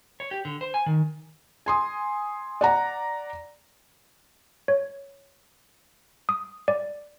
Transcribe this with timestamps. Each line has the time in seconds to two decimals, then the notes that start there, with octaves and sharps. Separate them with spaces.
0.20 C#5
0.31 G4
0.45 D3
0.61 C5
0.74 G#5
0.86 D#3
1.66 G#5 C6 D#6
2.61 D5 F#5 A#5
4.68 C#5
6.29 D#6
6.68 D5